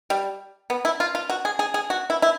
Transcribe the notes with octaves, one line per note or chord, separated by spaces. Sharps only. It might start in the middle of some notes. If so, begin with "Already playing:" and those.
G3
B3
E4
F4
F4
F#4
G#4
G#4
G#4
F#4
E4
E4